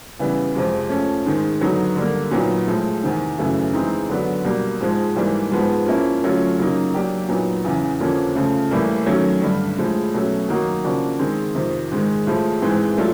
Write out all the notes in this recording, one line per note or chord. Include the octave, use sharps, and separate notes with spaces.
C#3 E3 G3 B3
F2 C3 F3 G#3
F3 A3 C#4
G#2 D#3 G#3
D3 F#3 B3 D#4
D3 G3 A#3
A#2 F#3 B3 D#4
A2 F3 G#3
E2 C3 D#3
F#2 C#3 E3 A3
E3 G#3 C4 D#4
D3 F#3 B3 D4
B2 G3 A#3
G#2 F3 G#3
G#2 E3 G3 A#3
G#2 F3 G#3 B3
F3 A#3 C#4 E4
D3 F#3 A3 C#4 F4
C#3 F#3 A#3 D#4
F#3 A#3 D4 G4 A#4
A#2 F#3 B3 D#4
E2 C#3 E3
F2 D3 F3 A#3 C#4
C#3 F3 A3
A2 E3 G3 A#3
D#3 F#3 A3 C#4
G2 D3 G3
A2 F3 G#3
B2 F#3 A3 C#4
D#3 F#3 A#3 D#4 F#4
C#3 F3 A#3 D4 F#4
D#3 G#3 C4
F2 C3 D#3
G#2 D#3 G#3
A2 F3 G#3
G#2 E3 G#3 C4
F#3 A3 D4 F4